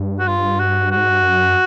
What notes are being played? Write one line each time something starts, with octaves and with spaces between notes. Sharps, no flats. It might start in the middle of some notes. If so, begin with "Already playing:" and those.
Already playing: G2
F#4
F4
F#4
F#4
G#2
G2
F#2